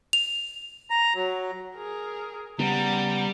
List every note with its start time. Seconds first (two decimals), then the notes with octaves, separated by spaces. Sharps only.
0.13 F7
0.90 A#5
1.15 F#3
1.76 G#4 A#4
2.59 C#3 G3 B3 F#5 A#5